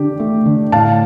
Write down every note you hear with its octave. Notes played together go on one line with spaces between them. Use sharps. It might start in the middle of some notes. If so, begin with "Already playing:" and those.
Already playing: D3 D4 G4
A3
D3
A2 F5 A5